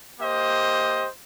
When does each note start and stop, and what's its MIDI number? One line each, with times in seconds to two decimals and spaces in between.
0.21 1.07 58
0.21 1.07 67
0.21 1.07 72
0.21 1.07 75